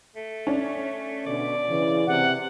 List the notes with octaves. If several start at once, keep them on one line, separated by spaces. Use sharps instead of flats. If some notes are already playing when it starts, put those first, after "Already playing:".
A3
C#4 D4
B2 D3 D5
C#3 E3
C3 F#5